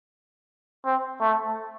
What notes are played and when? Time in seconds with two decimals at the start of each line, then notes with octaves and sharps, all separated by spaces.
0.85 C4
1.20 A3